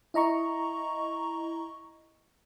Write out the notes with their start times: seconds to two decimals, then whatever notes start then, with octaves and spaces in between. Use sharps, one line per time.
0.14 E4 D#5 A#5 C#6